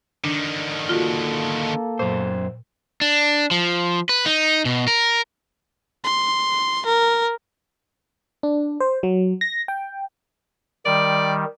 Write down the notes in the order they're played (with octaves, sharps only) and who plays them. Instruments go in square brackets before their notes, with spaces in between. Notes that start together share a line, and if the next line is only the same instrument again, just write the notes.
[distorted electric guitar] D3 D#3 [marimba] D4
[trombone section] A#3 A4 [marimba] F4 F#4
[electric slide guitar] F#2 C5 [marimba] A#2
[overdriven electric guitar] D4
F3
B4
D#4
B2
A#4
[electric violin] C6
A#4
[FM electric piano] D4
C5
F#3
A#6
G5
[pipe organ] D#3 G3 [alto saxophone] D5